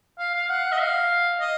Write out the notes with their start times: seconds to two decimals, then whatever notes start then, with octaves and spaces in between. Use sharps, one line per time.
0.19 F5
0.34 F5
0.49 F#5
0.72 D#5
0.80 F5
1.40 D#5